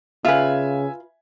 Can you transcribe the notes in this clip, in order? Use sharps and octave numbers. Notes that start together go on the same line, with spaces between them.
C#3 F4 B4 E5 G#5